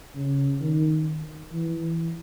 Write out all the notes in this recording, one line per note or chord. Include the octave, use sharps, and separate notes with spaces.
C#3
D#3
E3